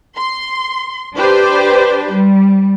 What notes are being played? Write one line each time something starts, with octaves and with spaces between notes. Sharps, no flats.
C6
D4 G4 B4 C5
G3